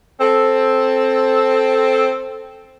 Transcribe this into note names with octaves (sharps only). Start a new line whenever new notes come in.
C4 A4